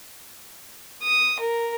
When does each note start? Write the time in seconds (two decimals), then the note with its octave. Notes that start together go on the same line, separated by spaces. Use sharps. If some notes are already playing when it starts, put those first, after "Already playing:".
1.03 D#6
1.40 A#4